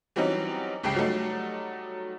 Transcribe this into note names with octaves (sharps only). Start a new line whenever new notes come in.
E3 F#3 G3 C4 C#4 D#4
G1 C#2 C#3 G4 G5 C7
F#3 G3 A3 D#4